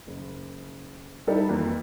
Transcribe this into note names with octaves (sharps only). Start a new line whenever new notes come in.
F#1
G3 D#4 E4 A4
F2 E3 A#3